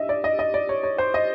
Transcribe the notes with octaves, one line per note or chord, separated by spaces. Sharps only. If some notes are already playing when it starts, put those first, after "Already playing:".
Already playing: D4 D#5 E5
D5
D#5
D#5
D5
C#5
C#5
C5
D#5